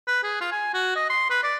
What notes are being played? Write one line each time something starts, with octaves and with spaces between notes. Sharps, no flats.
B4
G#4
F4
G#5
F#4
D#5
C6
B4
D5